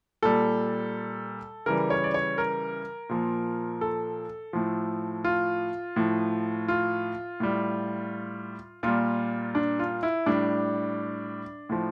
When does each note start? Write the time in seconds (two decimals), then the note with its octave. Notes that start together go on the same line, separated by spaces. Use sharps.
0.23 A#2 G3 A4
1.66 C#3 E3 G3 A#4
1.90 C#5
2.04 D5
2.14 C#5
2.38 A#4
3.09 A#2 F3
3.81 A4
4.53 A2 F3
5.24 F4
5.96 A2 F3
6.68 F4
7.40 A2 G3
8.83 A#2 G3 F4
9.55 D4
9.79 F4
10.03 E4
10.26 A2 G3 D4
11.69 A2 F3